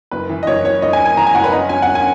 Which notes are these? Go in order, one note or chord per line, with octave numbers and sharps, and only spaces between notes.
F#1 B4
E3
D#5
F#1 C#5
F#1 C#5
F#1 D#5
G#5
F#1
G#5
E3 A#5
G#5
F#1 F#5
B4
C#4 D#5
C#4 G#5
C#4 F#5
G#5